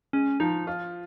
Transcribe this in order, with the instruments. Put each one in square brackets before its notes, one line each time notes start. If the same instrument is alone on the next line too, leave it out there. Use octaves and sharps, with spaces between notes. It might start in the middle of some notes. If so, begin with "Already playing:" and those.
[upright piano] G#3 [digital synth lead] C#4
[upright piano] F3 [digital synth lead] D#4
[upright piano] F4